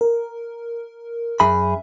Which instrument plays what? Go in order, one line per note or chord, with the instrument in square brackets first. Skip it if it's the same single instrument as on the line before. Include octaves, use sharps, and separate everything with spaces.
[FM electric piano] A#4
[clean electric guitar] F#2 G#4 B5 [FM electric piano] E5